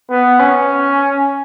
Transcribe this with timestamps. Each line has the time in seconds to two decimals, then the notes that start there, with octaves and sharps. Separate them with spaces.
0.10 B3
0.40 C#4